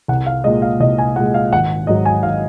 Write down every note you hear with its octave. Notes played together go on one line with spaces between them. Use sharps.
C2 F#5
F5
A#2 G#3 D#5
F5
C2 D#5
G#5
A#2 G#3 F#5
F5
G#1 F#5
G#2 F#3 D#5
G#5
G#1 F5